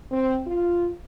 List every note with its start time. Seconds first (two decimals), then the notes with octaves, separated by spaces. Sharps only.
0.11 C4
0.47 F4